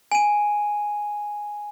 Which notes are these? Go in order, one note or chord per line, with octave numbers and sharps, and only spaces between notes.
G#5 D#7